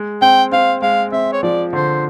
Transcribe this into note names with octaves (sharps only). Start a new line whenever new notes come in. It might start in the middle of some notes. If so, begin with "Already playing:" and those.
Already playing: G#3
C4 G5
C4 F5
G#3 F5
C4 E5
C#5
F3 D5
D3 C5